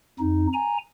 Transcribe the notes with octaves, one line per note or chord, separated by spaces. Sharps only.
F2 D#4
G#5 A#5